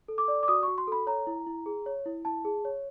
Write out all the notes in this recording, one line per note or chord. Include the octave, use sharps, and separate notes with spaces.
A4
D6
D5
D6
F#4 D#6
F#4 C#6
C6
A4 B5
C#5 A#5
E4
E4
G#4
C#5
E4
E4 A5
G#4
C#5